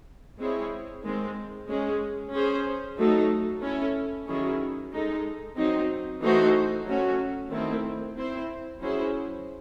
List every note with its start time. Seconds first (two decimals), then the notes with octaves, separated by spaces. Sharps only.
0.38 G#3 C4 E4 G#4 C#5
1.03 D#3 G#3 C4
1.68 G#3 C#4 G#4
2.33 C#4 G#4 C5
2.98 F#3 A3 D#4 A4
3.62 C#4 E4 A4
4.27 D#3 F#3 C#4 E4 G#4
4.92 G#3 D#4 A4
5.56 F#3 C4 D#4
6.21 E3 A3 D#4 F#4 C5
6.85 F#3 A3 C#4 F#4
7.51 D#3 A3 C4 E4
8.15 C4 E4 C5
8.80 F#3 C#4 E4 G#4 C5